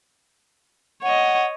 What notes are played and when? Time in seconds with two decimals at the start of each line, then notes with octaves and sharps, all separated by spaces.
1.03 C#5 D#5 F#5